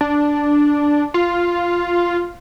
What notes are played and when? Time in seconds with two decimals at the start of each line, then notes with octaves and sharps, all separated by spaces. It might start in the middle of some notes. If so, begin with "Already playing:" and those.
0.01 D4
1.14 F4